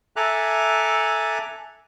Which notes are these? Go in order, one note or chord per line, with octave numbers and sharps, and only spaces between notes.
A4 E5 G#5 A#5 D6 F#6